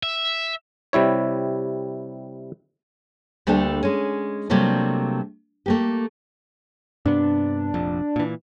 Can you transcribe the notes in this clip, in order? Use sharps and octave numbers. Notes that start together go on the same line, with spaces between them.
E5
C3 G3 E4 C#5
D2 G3 A3 A#3 D4 A4
G#3 C#4
C3 F#3 G3 A3 A#3 D4
A3 A#3 G4
G2 C3 B3 D4
F1 A#1 F2
A#2 E3